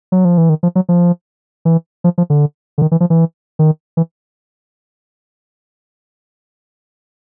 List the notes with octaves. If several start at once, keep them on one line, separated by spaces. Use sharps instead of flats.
F#3
F3
E3
D#3
F3
F#3
F3
E3
F3
F3
D3
D3
D#3
E3
F3
E3
D#3
E3